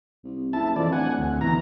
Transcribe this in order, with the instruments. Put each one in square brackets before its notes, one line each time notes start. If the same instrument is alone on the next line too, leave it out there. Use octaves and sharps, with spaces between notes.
[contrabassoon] C2
[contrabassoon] F#1 [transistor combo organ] E4 A5
[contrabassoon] F2 [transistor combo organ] E3 D5
[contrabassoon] D1 [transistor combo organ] F#5 G#5
[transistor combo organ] D2
[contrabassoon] B2 [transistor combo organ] E3 A#5